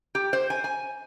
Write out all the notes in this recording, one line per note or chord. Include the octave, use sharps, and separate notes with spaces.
G4
C5
G#5
G#5